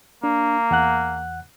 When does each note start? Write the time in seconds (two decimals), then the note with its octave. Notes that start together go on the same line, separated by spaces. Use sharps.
0.24 A#3 D4
0.71 E2 F#5 F#6